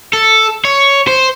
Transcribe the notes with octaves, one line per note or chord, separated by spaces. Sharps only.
A4
C#5
C5